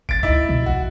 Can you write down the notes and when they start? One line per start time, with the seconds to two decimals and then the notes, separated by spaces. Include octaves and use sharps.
0.09 G1 A6 D7
0.23 C#2 D#4 E4 E5
0.49 B2
0.66 A#1 F#4